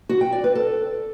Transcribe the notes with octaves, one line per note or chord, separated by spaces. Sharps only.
F#4
G5
D5
B4
A4